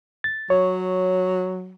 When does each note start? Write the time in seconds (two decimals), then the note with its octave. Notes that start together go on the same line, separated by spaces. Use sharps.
0.24 A6
0.50 F#3 C#5